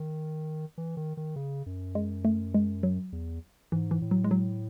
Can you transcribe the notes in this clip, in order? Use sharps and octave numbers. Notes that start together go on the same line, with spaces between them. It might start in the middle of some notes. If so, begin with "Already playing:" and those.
Already playing: D#3
E3
D#3
D#3
C#3
F#2
G#3
A3
G#3
F#3
E2
G#2 E3
E3
A2
F#3
G#3
F#3